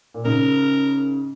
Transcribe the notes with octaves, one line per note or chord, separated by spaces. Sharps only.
A#2
G#2 C#3 A#4